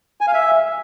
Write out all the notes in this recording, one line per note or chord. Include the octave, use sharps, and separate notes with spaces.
G#5
F5
E5